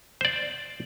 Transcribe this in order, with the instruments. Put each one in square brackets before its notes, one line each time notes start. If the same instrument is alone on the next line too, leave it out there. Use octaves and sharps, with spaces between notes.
[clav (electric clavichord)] C5 D5